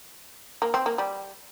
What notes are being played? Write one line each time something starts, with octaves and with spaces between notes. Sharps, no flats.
A#3
C4
A#3
G3